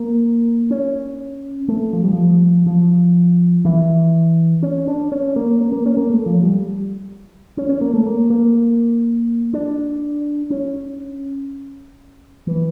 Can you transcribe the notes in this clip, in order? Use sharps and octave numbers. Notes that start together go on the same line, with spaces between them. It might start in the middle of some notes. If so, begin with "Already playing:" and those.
Already playing: A#3
C#4
A3
F3
G3
F3
F3
E3
C#4
D4
C#4
A#3
C#4
A#3
C#4
A#3
A3
F3
G3
C#4
C#4
A#3
A3
A#3
A#3
D4
C#4
E3